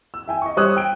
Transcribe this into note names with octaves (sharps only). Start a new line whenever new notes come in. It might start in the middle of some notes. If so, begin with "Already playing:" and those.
E6
E5 G5 G#5
D#5 C#6
G3 C5 C#5 D#6 E6 F#6
G5 D7